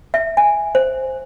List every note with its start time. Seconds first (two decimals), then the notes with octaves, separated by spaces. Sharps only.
0.14 E5
0.37 G#5
0.75 C5